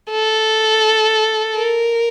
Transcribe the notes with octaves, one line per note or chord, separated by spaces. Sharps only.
A4
A#4